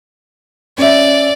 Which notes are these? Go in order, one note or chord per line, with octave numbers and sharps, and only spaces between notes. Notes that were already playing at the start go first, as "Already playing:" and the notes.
C#4 D5 E5